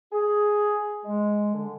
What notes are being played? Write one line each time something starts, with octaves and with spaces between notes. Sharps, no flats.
G#4
G#3
D3